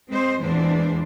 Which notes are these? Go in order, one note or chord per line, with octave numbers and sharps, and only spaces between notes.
G#3 C4 C5 D#5
E2 A#2 E3 G#3 D4 C5